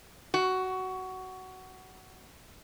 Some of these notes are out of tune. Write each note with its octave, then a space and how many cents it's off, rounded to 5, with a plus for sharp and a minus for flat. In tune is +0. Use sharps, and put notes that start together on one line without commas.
F#4 +15